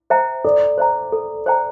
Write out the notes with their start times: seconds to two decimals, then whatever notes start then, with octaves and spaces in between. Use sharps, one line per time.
0.10 C5 E5 G5 A#5
0.44 A4 D5
0.78 C5 E5 G5 A#5
1.12 A4
1.46 C5 E5 G5 A#5